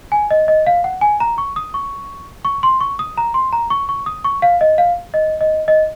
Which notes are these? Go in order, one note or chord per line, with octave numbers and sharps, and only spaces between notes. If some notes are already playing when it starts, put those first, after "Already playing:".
G#5
D#5
D#5
F5
F#5
G#5
A#5
C#6
D#6
C#6
C#6
C6
C#6
D#6
A#5
C6
A#5
C#6
C#6
D#6
C#6
F5
D#5
F5
D#5
D#5
D#5